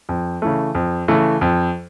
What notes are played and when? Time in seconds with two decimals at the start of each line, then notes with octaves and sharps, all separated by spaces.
0.09 F2
0.42 C#3 E3 A3
0.75 F2
1.08 C#3 E3 A3
1.41 F2